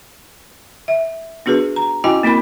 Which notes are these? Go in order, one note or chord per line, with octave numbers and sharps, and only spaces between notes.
E5
B3 D4 F#4 G#4 B4
A#5
C#4 E4 F#4 D#5 G5 G#5
A#3 C4 E4 A#4 B5